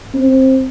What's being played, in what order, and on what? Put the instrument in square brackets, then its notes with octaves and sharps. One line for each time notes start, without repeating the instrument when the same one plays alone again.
[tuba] C4